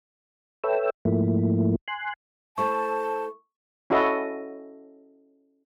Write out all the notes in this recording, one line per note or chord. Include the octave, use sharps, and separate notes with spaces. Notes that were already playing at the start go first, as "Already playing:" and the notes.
A4 B4 C#5 E5 G5 E6
G#2 F3 A3 A#3 E4
G#5 C6 F#6
A3 E4 C5 A5 C#6
C#4 E4 F#4 A4 D#5